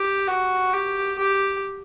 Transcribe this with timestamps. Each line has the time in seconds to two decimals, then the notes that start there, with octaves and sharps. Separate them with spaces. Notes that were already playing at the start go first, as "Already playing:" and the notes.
Already playing: G4
0.27 F#4
0.73 G4
1.18 G4